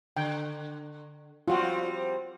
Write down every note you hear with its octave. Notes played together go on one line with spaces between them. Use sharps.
D3 G5
F3 G3 C4 F4 F#4